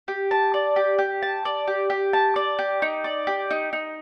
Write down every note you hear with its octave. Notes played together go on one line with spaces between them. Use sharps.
G4
A5
D5
G4
G4
A5
D5
G4
G4
A5
D5
G4
D#4
D5
G4
D#4
D#4